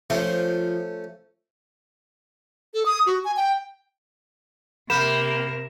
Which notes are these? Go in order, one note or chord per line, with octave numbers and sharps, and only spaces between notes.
F3 A3 C#4
A4
D#6
F#4
G#5
G5
C3 A#3 A#4 B5 G6 E7